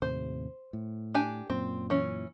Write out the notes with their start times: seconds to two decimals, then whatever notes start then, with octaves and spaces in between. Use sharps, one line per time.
0.02 D#2 A2 C3 C5
0.73 A2
1.14 D4 G4 G#5
1.50 F#2 A#2 C4
1.90 E3 C#4